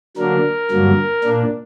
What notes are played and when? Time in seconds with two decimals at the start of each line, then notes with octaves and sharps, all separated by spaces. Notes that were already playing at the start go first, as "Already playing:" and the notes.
0.17 D3 F#3 A#3 D4 A#4
0.71 G2 D3 F#3 A#3
1.24 A#2 A#3 D4